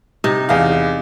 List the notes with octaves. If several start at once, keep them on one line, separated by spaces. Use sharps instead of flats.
C3 D#4
E2 F5